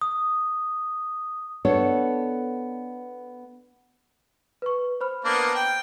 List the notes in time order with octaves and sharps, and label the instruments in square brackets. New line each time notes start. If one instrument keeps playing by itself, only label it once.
[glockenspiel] D#6
[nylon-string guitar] B3 D4 A4 C#5
[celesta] B4 C#6
C5 B5 F6
[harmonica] A#3 B3 D4
G5